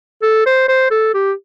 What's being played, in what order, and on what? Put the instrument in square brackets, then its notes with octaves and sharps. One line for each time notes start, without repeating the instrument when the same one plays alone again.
[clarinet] A4
C5
C5
A4
G4